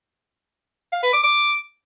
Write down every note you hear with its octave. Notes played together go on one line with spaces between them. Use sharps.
F5
B4
D6
D6